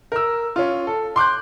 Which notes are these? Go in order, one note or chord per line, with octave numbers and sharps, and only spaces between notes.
A#4 E6
C#4 F4
A4
C6 D6 F#6 G6